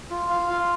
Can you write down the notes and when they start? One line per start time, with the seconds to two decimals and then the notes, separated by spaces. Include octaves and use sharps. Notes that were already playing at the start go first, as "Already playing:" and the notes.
0.11 F4
0.30 F5
0.50 F4